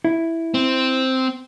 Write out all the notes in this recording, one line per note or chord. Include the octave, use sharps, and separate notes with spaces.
E4
C4